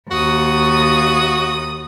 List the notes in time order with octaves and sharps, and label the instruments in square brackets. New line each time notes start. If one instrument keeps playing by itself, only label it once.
[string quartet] D#2 D#6 [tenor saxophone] F#4